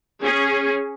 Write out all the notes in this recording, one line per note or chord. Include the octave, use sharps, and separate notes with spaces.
C#4 G#4